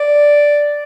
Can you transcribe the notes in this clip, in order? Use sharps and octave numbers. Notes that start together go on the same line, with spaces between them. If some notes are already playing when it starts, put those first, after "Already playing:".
Already playing: D5